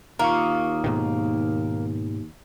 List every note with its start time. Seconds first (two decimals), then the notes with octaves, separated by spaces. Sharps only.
0.19 D#2 A#3 F4 F5 C#6
0.34 D#6
0.84 G#2 B2 D#3